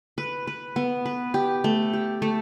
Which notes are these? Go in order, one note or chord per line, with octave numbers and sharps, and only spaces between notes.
B4
B4
B3
B4
G4
A3
G4
A3